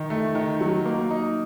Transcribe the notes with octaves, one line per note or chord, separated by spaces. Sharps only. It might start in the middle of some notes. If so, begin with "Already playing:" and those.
Already playing: D#3
A3
D#3
F#3
A#3
D#4